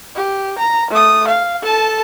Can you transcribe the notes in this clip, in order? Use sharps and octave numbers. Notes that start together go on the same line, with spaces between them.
G4
A#5
A3 D#6
F5
A4 A5